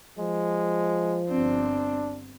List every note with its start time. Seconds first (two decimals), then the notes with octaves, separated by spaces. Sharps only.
0.19 F3 G#3
1.29 G1 C4 D4